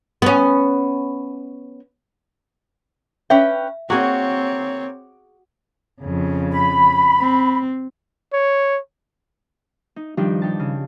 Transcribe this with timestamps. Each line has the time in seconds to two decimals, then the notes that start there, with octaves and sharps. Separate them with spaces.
0.22 B3 C#4
3.30 C#4 B4 E5 G5
3.90 A#3 C4 F#4 G#4 C#5
6.02 F2 C#3
6.52 B5
7.21 C4
8.33 C#5
9.96 D#4
10.17 G2 D#3 F3 D4 D#4 G4
10.42 D#4 G4 A5
10.60 C#3